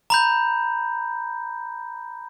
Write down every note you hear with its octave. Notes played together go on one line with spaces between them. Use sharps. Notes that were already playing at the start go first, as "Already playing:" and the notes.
A#5 B5 G6